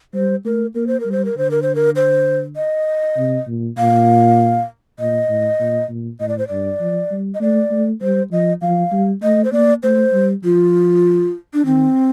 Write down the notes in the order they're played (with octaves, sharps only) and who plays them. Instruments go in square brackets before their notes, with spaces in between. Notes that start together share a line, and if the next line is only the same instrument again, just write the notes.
[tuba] G3 [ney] C5
[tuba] A3 [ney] A#4
[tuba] A#3 [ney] A#4
[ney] C5
A#4
[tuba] G3
[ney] C5
A#4
[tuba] D3 [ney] C5
[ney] A#4
C5
A#4
C5
D#5
[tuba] C3
A#2
[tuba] A#2 [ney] F5
[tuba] A#2 [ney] D#5
[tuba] A2
A#2
A#2
[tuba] A2 [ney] D#5
[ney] D5
C5
[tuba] G2 [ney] D5
[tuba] F3
G3
[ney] D#5
[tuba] A3 [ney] D5
[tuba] A3
[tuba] G3 [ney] C5
[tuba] F3 [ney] D#5
[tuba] F3 [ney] F5
[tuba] G3
[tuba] A3 [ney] D#5
[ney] C5
[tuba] A#3 [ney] D5
[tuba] A3 [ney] C5
[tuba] G3
[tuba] F3 [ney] F4
[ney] D4
[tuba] D#3 [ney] C4